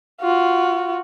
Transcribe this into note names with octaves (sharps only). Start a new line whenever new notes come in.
F4 F#4